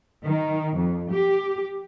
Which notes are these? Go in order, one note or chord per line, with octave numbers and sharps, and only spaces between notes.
D#3
F2
G4